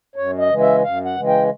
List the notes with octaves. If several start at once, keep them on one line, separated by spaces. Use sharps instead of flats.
F#2 C#5
D#5
C#3 E3 G#3
E5
F#2 F5
F#5
C#3 E3 G#3
G5